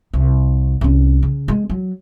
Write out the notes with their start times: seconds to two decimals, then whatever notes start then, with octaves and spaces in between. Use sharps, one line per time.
0.13 C2
0.81 C2 C#4
1.23 C#3
1.48 G#3
1.70 F#3